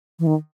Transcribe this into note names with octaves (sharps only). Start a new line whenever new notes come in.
E3
D#3